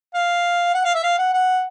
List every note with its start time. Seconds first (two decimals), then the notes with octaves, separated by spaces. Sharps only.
0.14 F5
0.74 F#5
0.85 F5
0.95 E5
1.03 F5
1.18 F#5
1.34 F#5